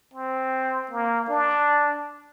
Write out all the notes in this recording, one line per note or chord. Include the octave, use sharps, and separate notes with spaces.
C4
A#3
D4